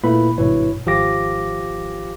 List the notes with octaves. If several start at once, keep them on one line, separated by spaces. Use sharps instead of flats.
A#2 A3 A#3 E4 B4 B5
G#1 G2 B2 E4 B4 C#5
G#1 F3 G4 F5 D6 A#6